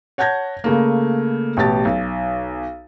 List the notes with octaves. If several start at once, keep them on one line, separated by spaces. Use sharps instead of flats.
C#5 F#5 A5 G6 G#6 A#6
C#3 A3 A#3
A1 B2 G4 A5 A6
B1